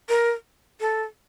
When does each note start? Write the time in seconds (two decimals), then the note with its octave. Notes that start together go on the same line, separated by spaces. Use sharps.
0.09 A#4
0.81 A4